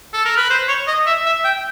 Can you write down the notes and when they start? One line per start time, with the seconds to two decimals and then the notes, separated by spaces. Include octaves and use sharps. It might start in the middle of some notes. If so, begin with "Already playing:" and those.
0.13 A4
0.25 A#4
0.37 B4
0.51 C5
0.68 C#5
0.87 D#5
1.07 E5
1.26 E5
1.44 G5